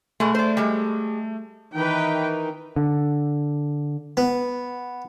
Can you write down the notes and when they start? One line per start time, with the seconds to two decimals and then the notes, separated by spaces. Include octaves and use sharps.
0.20 B2 G#3 A3
0.35 C5 D5
0.57 G3 G#3
1.73 D#3 E3 D#4 B4 G5
2.76 D3
4.17 B3